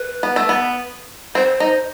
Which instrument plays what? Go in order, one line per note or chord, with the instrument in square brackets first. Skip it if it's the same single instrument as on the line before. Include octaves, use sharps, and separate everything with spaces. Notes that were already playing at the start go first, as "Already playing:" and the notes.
Already playing: [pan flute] B4
[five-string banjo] B3
A3
B3
[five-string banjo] C4 [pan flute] C5
[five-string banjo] D#4